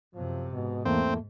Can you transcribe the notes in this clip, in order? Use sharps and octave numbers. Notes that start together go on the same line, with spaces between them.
F#2 C3 F3
G#2 B2
E2 A3 A#3 C4